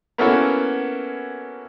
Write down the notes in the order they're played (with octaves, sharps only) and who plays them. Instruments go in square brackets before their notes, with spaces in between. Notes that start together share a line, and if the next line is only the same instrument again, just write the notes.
[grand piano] A#3 B3 C#4 E4 F#4 A4